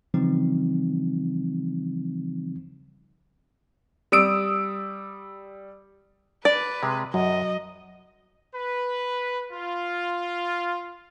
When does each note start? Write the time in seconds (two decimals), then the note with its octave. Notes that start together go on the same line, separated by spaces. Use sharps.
0.14 C#3 E3 F3 G3 C4 D#4
4.12 G3 D#6 E6 D7
6.45 B4 D5
6.83 C3 G#3
7.14 F#2 F#3 D#5
8.54 B4
9.52 F4